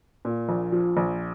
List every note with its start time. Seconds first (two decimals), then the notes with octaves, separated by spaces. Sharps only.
0.25 A#2
0.49 A#1
0.72 F3
0.97 A#1